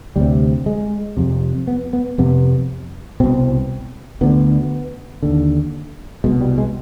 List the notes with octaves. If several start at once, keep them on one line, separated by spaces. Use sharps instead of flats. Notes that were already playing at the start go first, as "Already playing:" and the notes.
D2 C3 G3
G#3
F2 C3
B3
B3
F2 C3 B3
C2 B2 C4
D2 D3 B3
D#2 D3
C2 B2 G#3
G3
G#3